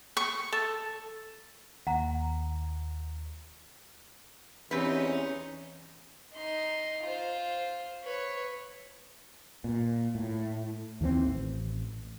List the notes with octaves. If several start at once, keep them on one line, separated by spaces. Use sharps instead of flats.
C#6
A4
D#2 F#5 A#5
E2 E3 C4 C#4 D#4 G4 B4
D#4 C6
F4 C5
B4 C#5
A#2
A2
D#2 E3 F3 C4
A1